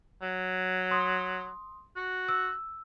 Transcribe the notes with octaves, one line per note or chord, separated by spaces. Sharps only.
F#3
C6 D#6
F#4
E6